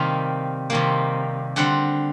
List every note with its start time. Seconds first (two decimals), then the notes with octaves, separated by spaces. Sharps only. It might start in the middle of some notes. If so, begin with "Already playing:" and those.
Already playing: C3 D#3 G3 A#3 F5
0.70 C3 D#3 G3 A#3
1.56 D3 G3 C4 F#5